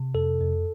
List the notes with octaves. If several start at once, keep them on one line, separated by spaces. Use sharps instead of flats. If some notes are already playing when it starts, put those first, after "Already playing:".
Already playing: C3
F2 A4
F2